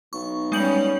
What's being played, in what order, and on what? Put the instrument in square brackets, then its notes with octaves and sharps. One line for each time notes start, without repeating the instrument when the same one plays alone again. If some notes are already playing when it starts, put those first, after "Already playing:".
[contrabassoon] B1 [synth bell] C#6
[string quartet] G3 C#4 [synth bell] G#3 G6 F#7